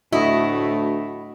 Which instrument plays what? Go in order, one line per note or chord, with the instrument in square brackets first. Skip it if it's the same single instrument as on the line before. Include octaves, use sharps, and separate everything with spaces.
[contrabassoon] D2 [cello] A2 A3 [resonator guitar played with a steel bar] E4 [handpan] F#4 D#5